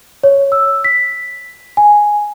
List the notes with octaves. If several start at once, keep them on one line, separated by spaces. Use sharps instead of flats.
C#5
E6
B6
G#5